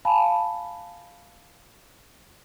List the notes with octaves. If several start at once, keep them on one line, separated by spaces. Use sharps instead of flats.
F5 G#5 A5 B5